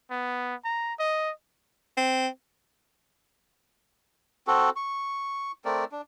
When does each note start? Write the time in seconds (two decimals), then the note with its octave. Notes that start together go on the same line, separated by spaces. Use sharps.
0.11 B3
0.65 A#5
0.99 D#5
1.97 C4
4.47 C4 F#4 A4
4.76 C#6
5.65 A3 C4 A#4 D5
5.92 D4